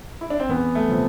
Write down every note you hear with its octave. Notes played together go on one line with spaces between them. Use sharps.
E4
D4
C4
E2 B3
A3
C3 F3